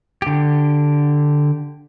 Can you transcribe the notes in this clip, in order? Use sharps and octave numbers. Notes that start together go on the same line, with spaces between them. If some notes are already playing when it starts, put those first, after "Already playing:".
D3 G4